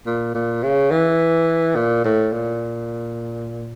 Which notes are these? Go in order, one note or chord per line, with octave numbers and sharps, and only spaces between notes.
A#2
A#2
C#3
E3
A#2
A2
A#2